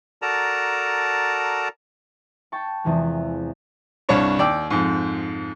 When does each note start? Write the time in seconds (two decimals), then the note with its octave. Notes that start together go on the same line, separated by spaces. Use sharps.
0.22 F#4 A4 A#4 D5 A5 A#5
2.52 G5 A5 C#6
2.84 E2 C3 E3 F3 G#3
4.09 C2 G2 D4 C#5 C#6
4.38 D#2 D5 G5 E6
4.70 F2 G#2